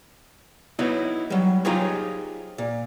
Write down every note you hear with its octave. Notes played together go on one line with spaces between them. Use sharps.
B3 D#4 E4 F#4 C#5
F#3 G3
D#4 F4 G4 G#4 C5 C#5
A#2